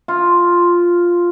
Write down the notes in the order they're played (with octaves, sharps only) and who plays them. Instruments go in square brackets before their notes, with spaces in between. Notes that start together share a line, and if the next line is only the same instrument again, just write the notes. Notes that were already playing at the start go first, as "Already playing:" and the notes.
[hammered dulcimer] F4